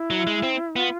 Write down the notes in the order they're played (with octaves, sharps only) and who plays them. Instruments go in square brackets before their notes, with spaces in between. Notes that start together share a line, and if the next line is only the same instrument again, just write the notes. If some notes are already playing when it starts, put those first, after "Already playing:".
Already playing: [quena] E4
[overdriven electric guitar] F#3
G#3
C4
[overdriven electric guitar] B3 [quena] F4